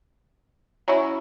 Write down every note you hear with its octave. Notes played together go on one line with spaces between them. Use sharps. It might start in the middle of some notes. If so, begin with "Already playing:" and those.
F#3 C#4 E4